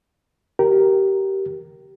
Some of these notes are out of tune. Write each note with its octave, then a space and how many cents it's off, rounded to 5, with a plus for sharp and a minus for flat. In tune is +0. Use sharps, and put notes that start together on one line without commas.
G4 -20 A#4 +0